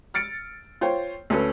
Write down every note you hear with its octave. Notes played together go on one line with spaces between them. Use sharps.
F6 A6 C#7 D7
F4 C5 C#5 G5
D2 C#4 A4 B4